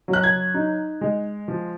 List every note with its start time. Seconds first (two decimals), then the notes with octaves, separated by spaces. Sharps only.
0.08 F#3
0.13 F#6
0.24 G#6
0.54 D#4
1.01 G#3
1.48 F3